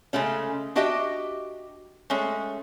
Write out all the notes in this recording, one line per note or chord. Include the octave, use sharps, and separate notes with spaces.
C#3 G#3 A3 C#4
D4 F#4 G4 D#5 E5 G5
G#3 A3 C#4